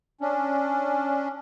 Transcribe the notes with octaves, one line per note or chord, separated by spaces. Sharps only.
C#4 D4